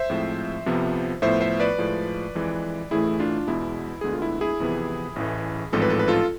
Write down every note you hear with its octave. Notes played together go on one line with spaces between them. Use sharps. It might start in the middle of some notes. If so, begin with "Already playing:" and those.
Already playing: C5 E5
A2 F3 G#3 C4
F2 C3 F3 B3
A2 F3 B3 C5 E5
C5 E5
B4 D5
A2 F3 G#3
F2 E3 G#3
A1 A2 E3 A3 E4 G#4
D4 F4
E2 B2 G#3 B3 E4
D2 D3 G#3 B3 G#4
F4
E4
E4 G#4
F2 C3 E3 B3
A1 A2 E3
A1 G#2 F3 G#3 C4 A4
B4
A4
B4
F4 A4